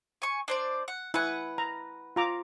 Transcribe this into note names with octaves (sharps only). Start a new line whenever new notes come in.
G#5 C#6
D4 C5 D5
F#5
E4 B4 F#5 G#5
A#5
F4 A#5 D6